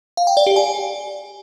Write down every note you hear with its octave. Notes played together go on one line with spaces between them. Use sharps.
F5
G5
D5
G4
G#5